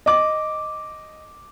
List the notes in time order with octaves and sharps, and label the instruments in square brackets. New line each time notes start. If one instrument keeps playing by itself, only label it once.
[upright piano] D#5 D6